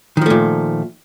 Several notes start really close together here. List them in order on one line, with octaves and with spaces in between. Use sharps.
D#3 F3 A3 A#2